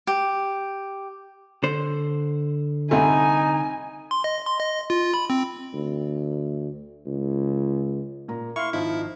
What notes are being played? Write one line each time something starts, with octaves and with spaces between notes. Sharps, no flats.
G4
D3 C5
C2 C3 A3 D#4 G#5
C6
D#5
C6
D#5
F4
B5
C4
D2
C#2
A#2 A#5
E4 F5 C6 C#6 F6
G#1 F3 D#4 E4